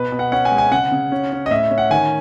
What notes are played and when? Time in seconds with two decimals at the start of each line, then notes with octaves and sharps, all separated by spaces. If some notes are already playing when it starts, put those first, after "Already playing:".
Already playing: B2 B4
0.12 B2
0.19 F#5
0.32 C#4 F#5
0.45 G#5
0.52 G#3
0.58 G#5
0.72 C#3 F#5
0.92 C#3
1.12 C#4
1.32 C#4
1.46 D#5
1.51 A2 E5
1.71 C#4
1.78 F#5
1.90 D#3 G#5